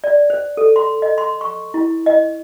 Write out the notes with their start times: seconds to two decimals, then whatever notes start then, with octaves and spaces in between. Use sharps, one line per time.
0.04 D5
0.30 C5
0.57 A4
0.76 C6
1.02 D#5
1.18 C6
1.41 C#6
1.74 E4
2.06 D#5